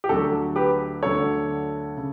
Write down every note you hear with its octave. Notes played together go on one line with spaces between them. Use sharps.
G4
D2 D3 F#3 F#4 A4
G4 B4
D2 D3 F#3 A4 C#5
C#3